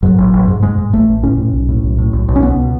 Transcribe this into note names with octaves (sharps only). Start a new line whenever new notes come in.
G#2 F#3
A1
A1
G#2
G#2 G#3
G#2
A1 A3
A1
A2 C#4
A2
B1
A2
B1
A2
B1
B1
C#4
C#2 B3
B2